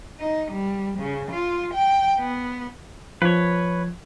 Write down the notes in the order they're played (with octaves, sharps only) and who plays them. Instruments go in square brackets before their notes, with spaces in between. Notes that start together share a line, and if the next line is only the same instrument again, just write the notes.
[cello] D#4
G3
C#3
F4
G5
B3
[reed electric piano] F3 [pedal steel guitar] B4 C#5